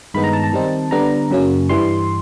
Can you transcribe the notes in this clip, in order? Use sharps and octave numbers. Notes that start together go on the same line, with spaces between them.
G2 D#3 G#3 B3 D#4 B5
A#5
A5
A5
D#3 G3 C4 D#4
D3 G3 B3 D4 A#5
F#2 C#3 F#3 A#3 C#4
G2 E3 G3 C6